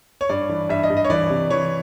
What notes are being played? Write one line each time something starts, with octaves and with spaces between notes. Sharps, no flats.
C#5
G2 D5
E3
G2 E5
D#5
G2
D#5
C#5
E3 D5
C3
E3 C#5